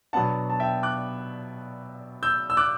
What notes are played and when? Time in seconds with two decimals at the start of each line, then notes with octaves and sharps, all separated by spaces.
0.13 B2 F#3 B3 D4 F#5 A5
0.50 A5
0.60 E5 G5
0.83 D6 F#6
2.23 E6 G6
2.50 E6
2.57 D6 F#6